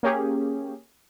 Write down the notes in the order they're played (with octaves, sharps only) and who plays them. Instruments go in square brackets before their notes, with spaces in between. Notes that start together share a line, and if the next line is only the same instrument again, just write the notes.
[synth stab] A#3 C#4 G4 G#4